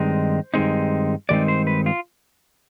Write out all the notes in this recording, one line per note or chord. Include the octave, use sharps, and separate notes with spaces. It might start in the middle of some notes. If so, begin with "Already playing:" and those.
Already playing: G2 D#3 G#3 C4 D#4 C5
G2 D#3 G#3 C4 D#4
G2 D#3 G#3 C4 D#4 D5
C5
B4
F4